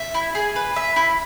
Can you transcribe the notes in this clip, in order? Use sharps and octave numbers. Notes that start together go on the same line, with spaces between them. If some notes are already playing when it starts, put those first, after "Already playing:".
Already playing: E5
E4
G#4
B4
E5
E4